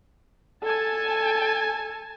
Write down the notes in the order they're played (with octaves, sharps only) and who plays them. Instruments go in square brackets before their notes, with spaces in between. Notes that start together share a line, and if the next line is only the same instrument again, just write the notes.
[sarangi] A4 [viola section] G#5 A5